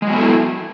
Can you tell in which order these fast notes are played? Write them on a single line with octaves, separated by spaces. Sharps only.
G#3 F#3 B3 A4 E4